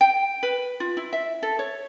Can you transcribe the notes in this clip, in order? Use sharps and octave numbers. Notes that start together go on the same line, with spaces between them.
G5
B4
F4
E4
E5
A4
C#5